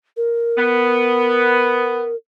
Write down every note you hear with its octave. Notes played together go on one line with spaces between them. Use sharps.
A#4
B3